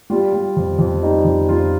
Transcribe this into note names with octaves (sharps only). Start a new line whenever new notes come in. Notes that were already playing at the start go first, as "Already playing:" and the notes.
G3 F4
G3
F2
F2
G3 D#4
F2
F2 F4